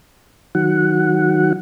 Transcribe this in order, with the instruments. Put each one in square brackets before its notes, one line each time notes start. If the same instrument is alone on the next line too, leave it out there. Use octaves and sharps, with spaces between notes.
[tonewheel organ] D#3 F#3 F#5